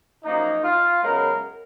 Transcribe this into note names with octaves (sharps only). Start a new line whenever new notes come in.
F#2 F3 A#3 D#4
F4
F#2 C#3 G#3 B3 A#4